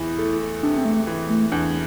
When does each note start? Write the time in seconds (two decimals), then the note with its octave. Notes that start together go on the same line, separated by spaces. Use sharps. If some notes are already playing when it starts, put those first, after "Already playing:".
Already playing: E2 E3 E4
0.18 A3
0.63 C3 D4
0.78 C4
0.85 A3
1.07 E3
1.29 A3
1.52 E2 D4